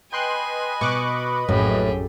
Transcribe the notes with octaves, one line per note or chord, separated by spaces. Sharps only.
B4 D#5 G5 G#5 B5 C6 F#6
B2 C#6 D6 F#6
A#1 F#2 A2 G4 G#4